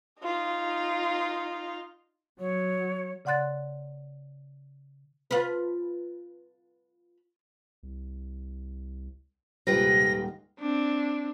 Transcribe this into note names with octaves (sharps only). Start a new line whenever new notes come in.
D#4 F4
F#3 C#5
C#3 D5 F#5 C6 F#6 A6
F4 B4
C2
D#1 G#2 C3 F4 G4 B4 C5 A#6
C4 D4